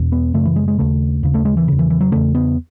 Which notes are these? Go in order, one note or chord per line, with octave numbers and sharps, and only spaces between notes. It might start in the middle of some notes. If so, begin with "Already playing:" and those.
Already playing: E2 B2
B3
F#2 C#3 A3
E3
G#3
G#3
D#2 C#3 A3
D#2 C#3
A3
G#3
E3
E2 C#3
E3
E3
F#3
E2 C#3 A3
B3